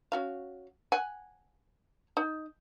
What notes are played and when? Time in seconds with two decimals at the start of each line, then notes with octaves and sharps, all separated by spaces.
0.12 C#4 F#4 F5
0.92 F#5 G#5
2.17 D#4